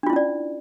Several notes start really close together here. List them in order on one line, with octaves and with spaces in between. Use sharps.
D4 F4 E4 C#4 D5